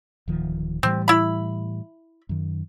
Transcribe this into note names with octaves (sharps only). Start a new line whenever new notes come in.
D1 D#3 F3
A2 E3 G3 C4
E4 B5
F#2 D#3